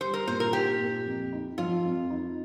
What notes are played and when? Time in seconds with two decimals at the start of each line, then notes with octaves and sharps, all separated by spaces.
0.01 G3 C5
0.14 A#4
0.27 A#2 C5
0.40 A#4
0.53 D#4 G4
0.80 A#2
1.05 F2
1.32 D#4
1.58 F3 F4
1.85 F2
2.10 D#4